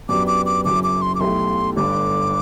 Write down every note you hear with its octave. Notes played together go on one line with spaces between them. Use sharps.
F#2 F#3 B3 D4 G4 D6
D6
D6
F#1 F#2 F#3 D6
D6
C6
D6
B1 B2 A3 E4 G4 C6
G1 G2 D3 D6